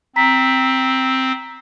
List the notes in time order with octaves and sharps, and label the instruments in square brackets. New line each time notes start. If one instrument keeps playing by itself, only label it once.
[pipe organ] C4 [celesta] A#5 B6